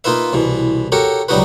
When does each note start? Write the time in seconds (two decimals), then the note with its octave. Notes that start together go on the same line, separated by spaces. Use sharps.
0.04 A#3 D#4 F4 B4 E5
0.33 C2 B2 E3
0.92 F#4 G4 A4 A#4 C#5
1.29 C#2 F#3 G3 D#4 F#4 B4